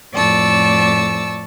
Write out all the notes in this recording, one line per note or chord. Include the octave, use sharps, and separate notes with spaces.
F2 A2 D5 A5 C#6 E6